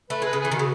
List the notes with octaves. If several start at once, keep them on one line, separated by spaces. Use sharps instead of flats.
A3 B4
G#3 B4
C#3
E3 G#4
D#3
C#3 F#4